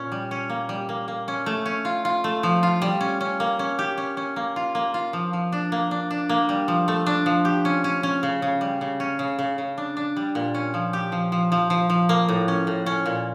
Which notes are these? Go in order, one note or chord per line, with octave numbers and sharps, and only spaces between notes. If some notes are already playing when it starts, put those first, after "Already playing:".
Already playing: A#2 C#4
G3
C#4
A#3
G3
A#3
A#3
C#4
A3
C#4
F4
F4
A3
F3
F4
G3
C#4
C#4
A#3
C#4
G4
C#4
C#4
A#3
F4
A#3
F4
F3
F3
D4
A#3
D4
D4
A#3
G3
F3
A3
D4
F3
G4
C#4
C#4
C#4
C#3
C#3
G3
C#3
C#4
C#3
C#3
C#3
D4
D4
G3
A#2
C#4
F3
G4
F3
F3
F3
F3
F3
A#3
A2
C#4
A2
C#4
A#2